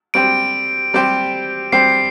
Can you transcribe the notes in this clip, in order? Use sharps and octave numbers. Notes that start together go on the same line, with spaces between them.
G3 C4 G4 C5 D7
G3 C4 G4 C5
G3 C4 G4 C5 C7